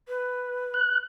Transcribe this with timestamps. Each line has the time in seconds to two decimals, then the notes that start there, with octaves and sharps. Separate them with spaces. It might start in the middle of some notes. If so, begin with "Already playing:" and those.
0.08 B4
0.74 F#6